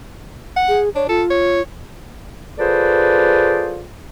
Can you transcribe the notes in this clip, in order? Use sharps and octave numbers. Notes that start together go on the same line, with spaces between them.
F#5
G#4
D4 C#5
F4 A4
C#5
F4 G#4 A4 B4 C5 D5